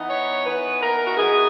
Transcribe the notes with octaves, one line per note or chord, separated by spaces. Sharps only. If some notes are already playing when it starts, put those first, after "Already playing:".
Already playing: E3 B3 D#4
C#5
E3 B3 D#4 B4
A#4
F#4
E3 B3 D#4 G#4